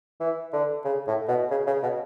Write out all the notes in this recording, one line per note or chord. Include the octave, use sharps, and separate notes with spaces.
E3
D3
C#3
A2
B2
C#3
C#3
B2